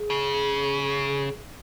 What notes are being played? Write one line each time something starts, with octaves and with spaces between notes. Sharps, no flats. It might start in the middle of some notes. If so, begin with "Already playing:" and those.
Already playing: G#4
C#3